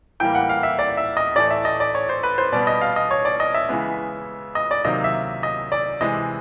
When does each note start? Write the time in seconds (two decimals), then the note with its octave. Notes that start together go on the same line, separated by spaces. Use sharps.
0.20 A2 E3 G3 A#3 G5
0.35 F#5
0.49 F5
0.63 E5
0.79 D5
0.97 E5
1.17 D#5
1.36 A2 E3 A3 D5
1.51 E5
1.65 D#5
1.80 D5
1.95 C#5
2.09 C5
2.23 B4
2.38 C5
2.52 B2 G3 B3 D5
2.67 D#5
2.81 F5
2.96 D#5
3.11 C#5
3.25 D5
3.40 D#5
3.54 E5
3.69 C#3 E3 G#3 B3
4.55 D#5
4.71 D5
4.85 C3 D#3 F#3 A#3 D#5
5.04 E5
5.43 D#5
5.72 D5
6.01 C3 E3 G#3 D#5